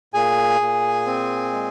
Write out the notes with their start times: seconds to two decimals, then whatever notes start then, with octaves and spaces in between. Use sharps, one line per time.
0.14 A#2 G#4 G#5
0.61 A#2
1.06 C4
1.53 G#3